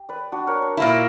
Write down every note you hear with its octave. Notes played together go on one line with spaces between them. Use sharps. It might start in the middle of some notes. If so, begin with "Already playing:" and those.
Already playing: G4
B4 D5
D4 F#4
A#4 C#5
D4
A#2 A#3 E4